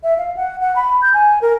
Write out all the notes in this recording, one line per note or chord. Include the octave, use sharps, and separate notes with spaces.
E5
F5
F#5
F#5
B5
G6
G#5
A#4